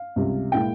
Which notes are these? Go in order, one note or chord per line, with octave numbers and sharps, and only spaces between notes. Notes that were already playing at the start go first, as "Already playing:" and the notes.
Already playing: F5
C#2 C3 G3
A#2 G#3 E4 G5